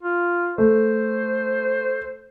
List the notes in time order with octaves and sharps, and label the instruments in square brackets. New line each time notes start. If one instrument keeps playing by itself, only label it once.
[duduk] F4
[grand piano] A3 [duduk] C5